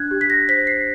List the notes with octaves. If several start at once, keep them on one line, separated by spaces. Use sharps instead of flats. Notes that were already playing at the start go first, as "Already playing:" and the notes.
Already playing: D4 F#6 G#6
G4
B6
A#6
C5 B6
C7